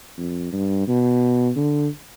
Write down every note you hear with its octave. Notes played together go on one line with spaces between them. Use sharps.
F2
G2
B2
D3